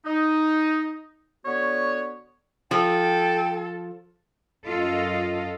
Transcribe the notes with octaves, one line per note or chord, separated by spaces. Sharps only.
D#4
D3 B3 F#4 C#5
F3 A4 G5
F#2 F4 A4 D#5